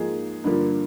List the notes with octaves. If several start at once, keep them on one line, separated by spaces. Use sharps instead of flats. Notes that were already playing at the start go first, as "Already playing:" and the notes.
Already playing: G#2 F3 A#3 D#4 G#4
G2 D3 F3 A#3